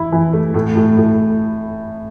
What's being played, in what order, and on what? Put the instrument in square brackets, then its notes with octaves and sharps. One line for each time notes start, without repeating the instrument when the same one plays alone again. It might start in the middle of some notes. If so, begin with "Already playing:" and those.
Already playing: [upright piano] E3 E4
E3
A3
A2
A2
A2